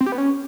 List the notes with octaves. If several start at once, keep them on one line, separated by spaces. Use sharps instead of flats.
C4
G4
B3
C#4